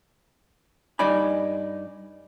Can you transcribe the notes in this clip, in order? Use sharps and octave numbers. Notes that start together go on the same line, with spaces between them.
G2 D#4 D5 G#5 B5